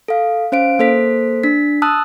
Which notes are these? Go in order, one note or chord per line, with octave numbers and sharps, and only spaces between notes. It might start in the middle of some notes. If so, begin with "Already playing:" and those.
A4 F5
C#4 C5 F5 D7
A#3 A4 C5 B6
D4 B6
A5 D#6 E6 F#6